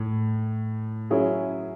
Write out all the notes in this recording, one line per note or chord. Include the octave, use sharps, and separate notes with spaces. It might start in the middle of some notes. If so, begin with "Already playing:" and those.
Already playing: A2
F#3 C#4 E4 G#4